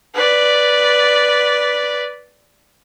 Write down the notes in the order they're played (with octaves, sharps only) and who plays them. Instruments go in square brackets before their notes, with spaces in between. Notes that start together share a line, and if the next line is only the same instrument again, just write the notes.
[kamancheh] B4 D5